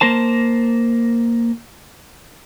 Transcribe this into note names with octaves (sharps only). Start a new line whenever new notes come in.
A#3 A#4 C5 A5